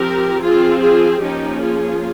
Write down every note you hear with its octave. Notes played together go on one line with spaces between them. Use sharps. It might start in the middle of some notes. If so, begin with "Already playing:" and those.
Already playing: F3 C4 G4 A#4
F3 C4 F4 G#4
F4 G#4
F3 A#3 C#4 D#4 G4
F4 G#4